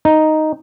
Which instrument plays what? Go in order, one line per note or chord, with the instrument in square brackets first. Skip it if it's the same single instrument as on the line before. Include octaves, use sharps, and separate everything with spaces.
[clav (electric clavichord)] D#4